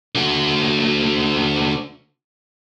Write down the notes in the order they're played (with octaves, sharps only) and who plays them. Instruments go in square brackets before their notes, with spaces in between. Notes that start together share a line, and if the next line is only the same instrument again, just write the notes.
[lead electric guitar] D3 F#4